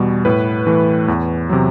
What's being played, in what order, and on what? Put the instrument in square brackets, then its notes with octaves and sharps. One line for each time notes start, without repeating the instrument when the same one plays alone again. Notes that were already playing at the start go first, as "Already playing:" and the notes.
Already playing: [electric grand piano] E2 B2 G3
A2 B4
E3 A3
E2
C3 F#3